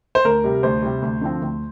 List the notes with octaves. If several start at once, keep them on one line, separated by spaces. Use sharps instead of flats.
C5
D2 A#4
C3 G3
D2 C5
C3 G3
D2
D3 F3 C4
D2